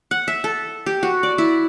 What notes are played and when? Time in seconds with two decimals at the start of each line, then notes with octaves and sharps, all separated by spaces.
0.11 F#5
0.28 E5
0.44 A4
0.86 G4
1.03 F#4
1.23 D5
1.38 E4